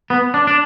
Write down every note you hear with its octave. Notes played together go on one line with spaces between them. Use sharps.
B3
D4
D4